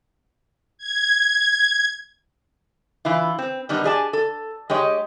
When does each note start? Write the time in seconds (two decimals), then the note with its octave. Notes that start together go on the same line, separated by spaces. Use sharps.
0.78 G#6
3.05 E3 E4 F4
3.39 C4
3.69 D#3 G3 B3 D4 D#4
3.84 G4 G#4 D5 G#5 A5
4.13 A4
4.70 G#3 G4 C#5 D#5